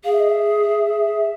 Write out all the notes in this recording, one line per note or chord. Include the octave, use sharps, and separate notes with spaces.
G#4 F5
E5
D#5
E5